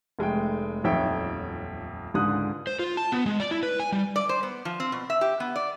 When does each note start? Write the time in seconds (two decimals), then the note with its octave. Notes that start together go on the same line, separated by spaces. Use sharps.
0.19 F1 G#3 A3 G5
0.84 D#1 B1 F2 C#5 E5 G5
2.14 C#2 G#2 D3 D#6 F#6
2.67 C5
2.79 F4
2.97 A5
3.12 B3
3.26 G#3
3.40 D5
3.51 E4
3.63 B4
3.80 G#5
3.92 G3
4.16 D5
4.29 C5
4.43 B3
4.65 F3
4.80 C4
4.92 B2
5.10 E5
5.21 G4
5.40 B3
5.56 D5